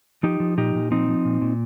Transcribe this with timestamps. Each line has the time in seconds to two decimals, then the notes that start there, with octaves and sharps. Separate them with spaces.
0.23 F3 D#4 G4
0.40 F3
0.57 A#2 D#4 G4
0.75 A#2
0.91 F3 C4 D#4
1.08 F3
1.25 A#2
1.41 A#2